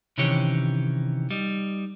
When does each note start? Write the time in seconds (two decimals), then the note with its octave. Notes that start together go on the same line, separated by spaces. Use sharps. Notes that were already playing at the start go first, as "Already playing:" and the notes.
0.18 C3 D#3 E3 C#4 G4 C#5
1.30 G3 D#4